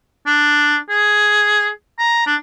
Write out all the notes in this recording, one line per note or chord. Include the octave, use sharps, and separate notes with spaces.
D4
G#4
A#5
D4